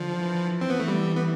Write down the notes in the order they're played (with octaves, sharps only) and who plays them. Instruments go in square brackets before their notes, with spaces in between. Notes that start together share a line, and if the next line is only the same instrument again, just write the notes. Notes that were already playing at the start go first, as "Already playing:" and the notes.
Already playing: [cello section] D3 [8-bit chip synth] F3
[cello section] E3
[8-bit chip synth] C4
B3
A3
G3
B3